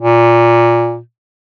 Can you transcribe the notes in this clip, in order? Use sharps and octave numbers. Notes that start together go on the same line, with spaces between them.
A#2